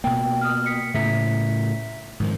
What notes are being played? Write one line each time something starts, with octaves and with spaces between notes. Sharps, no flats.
B2 A#3 G5
D#6 F6
D#6 B6 C#7
A2 C#3 E5 A#5 B6
G#2 D#3 F3